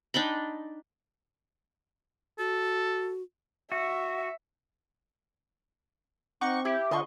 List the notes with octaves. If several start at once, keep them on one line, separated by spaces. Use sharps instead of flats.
D4 D#4 G5 B5
F#4 A4
F#4 E5
C4 D#4 F#5 C#6 D6
E4 G4 E5
D3 F4 D#5 C6 C#6